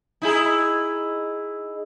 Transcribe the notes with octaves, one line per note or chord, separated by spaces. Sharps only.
D#4 E4 G#4